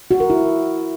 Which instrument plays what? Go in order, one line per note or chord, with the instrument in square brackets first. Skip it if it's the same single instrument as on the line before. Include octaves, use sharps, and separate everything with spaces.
[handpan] F#4
A#4
E4